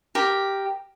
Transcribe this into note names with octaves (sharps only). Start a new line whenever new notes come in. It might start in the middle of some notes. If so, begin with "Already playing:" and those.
G4 A#4